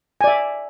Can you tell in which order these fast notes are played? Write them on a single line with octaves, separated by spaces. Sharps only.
G#5 D5 E5